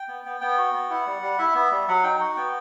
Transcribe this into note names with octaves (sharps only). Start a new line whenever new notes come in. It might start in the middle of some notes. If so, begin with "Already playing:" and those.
Already playing: G5
B3
B3
B3 G5
F#4
B3
E4 F#5
G3
G3
E4 E5
B3
G3
F#3 F#5
D#4 G5
F#4 F#5
B3 G5